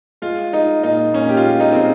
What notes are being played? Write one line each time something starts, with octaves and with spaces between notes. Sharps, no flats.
G#3 F4
G#3 D#4
A#2 D#4
A#2 C#4
G4
F4
G#3
D#4
G#3 C4